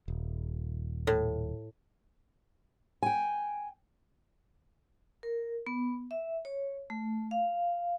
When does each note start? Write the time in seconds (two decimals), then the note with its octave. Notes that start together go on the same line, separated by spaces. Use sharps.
0.08 D#1
1.07 A2
3.03 G5 G#5
5.23 A#4
5.67 B3
6.11 E5
6.45 C#5
6.90 A3
7.31 F5